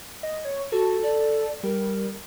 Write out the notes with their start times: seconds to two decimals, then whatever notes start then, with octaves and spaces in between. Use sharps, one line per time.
0.23 D#5
0.45 C#5
0.72 F#4 A4
1.03 D5
1.63 G3 A#4